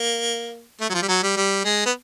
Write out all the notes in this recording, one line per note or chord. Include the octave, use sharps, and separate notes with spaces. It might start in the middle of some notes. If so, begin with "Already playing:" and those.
Already playing: A#3
A3
F#3
F3
G3
F#3
G3
G3
G#3
B3